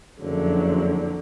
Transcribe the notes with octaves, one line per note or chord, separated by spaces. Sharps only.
F#1 F2 D3 F#3